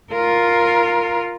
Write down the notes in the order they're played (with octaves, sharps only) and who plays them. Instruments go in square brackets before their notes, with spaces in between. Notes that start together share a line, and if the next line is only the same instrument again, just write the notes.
[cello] F4 A#4